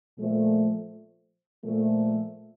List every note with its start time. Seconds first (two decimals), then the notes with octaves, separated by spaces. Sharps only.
0.17 A#2 F3 A3
1.65 A#2 F3 A3